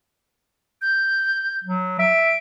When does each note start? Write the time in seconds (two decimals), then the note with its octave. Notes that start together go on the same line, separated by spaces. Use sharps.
0.82 G6
1.64 F#3
1.99 E5 D7